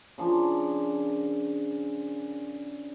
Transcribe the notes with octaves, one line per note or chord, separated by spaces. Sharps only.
C#3 F3 D4 A#4